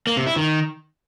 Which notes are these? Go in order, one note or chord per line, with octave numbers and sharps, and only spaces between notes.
A#3
C3
E4
D#3